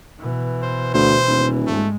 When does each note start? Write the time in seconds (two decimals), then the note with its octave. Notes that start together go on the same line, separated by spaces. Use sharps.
0.19 B2 E3
0.62 C5
0.94 D2 C5
1.28 D#1
1.66 G#2 G#3 A3